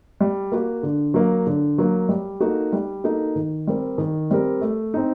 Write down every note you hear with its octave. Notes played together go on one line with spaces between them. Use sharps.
G3
A#3 F#4
D3
F#3 A#3
D3
F#3 A#3
G3
A#3 D#4 F#4 A4
G3
A#3 D#4 F#4 A4
D#3
G3 C4 G4 A#4
D#3
G3 C4 G4 A#4
A3
C4 D#4